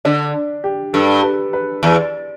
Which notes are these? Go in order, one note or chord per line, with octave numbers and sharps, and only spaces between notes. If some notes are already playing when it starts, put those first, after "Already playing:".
D3 D4
G4
G2 A4
B4
B4
E2 D5